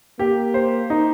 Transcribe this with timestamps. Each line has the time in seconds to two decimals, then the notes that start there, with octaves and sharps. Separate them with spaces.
0.19 A#3 G4
0.54 C5
0.90 D#4